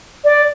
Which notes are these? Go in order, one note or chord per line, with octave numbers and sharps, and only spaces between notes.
D5